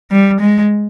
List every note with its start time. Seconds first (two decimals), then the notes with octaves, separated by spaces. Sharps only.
0.11 G3
0.40 G#3